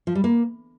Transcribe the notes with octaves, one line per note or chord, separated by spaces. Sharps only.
F3
G3
A#3